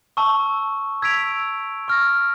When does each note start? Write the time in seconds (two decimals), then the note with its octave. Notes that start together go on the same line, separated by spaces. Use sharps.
0.17 A5 C#6 E6
1.02 E6 G#6 B6 D7 F7
1.88 C#6 F6 A#6